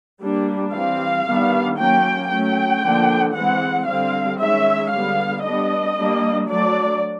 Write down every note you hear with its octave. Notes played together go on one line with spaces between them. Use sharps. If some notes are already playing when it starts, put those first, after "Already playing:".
G3 A#3 D4
E3 G3 C4 F5
D#3 G3 B3 D4
F#3 A#3 C#4 G5
F#3 A3 C#4 G5
D3 F3 A#3 D4
E3 G#3 C4 F#5
D3 G3 C4 F5
D#3 G#3 C#4 E5
D3 G3 B3 F5
G3 B3 D4 D#5
G3 A#3 D4
F#3 A3 D4 D5